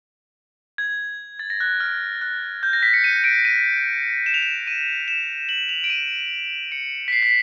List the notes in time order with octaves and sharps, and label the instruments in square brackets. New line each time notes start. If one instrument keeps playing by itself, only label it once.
[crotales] G#6
A6
A#6
F#6
F6
F#6
G6
A#6
B6
C#7
D#7
D7
D#7
E7
F7
E7
D#7
E7
F#7
F7
D7
D#7
C#7
B6
C7
B6